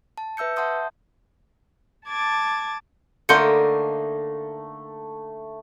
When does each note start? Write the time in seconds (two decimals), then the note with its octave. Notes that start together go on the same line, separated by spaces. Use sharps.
0.18 A5
0.37 B4 E5 E6 G6 C#7
0.56 E5 F#5 A5 C6 D#6 G6
2.07 A5 D6 G#6 A6
3.29 D3 A3 A#3 D#4 C6 G6 C#7